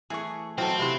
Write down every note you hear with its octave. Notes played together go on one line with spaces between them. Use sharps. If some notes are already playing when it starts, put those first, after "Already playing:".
E3 A3 G#4 C#6
E3 F#3 C4 D#4 F4 A4
C3 E3 B4 C5 E5